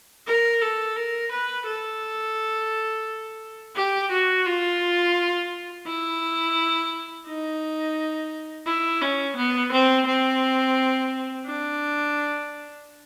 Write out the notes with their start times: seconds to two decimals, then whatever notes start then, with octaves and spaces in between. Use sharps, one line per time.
0.27 A#4
0.61 A4
0.96 A#4
1.32 B4
1.66 A4
3.76 G4
4.11 F#4
4.46 F4
5.87 E4
7.27 D#4
8.66 E4
9.01 C#4
9.36 B3
9.72 C4
10.07 C4
11.46 D4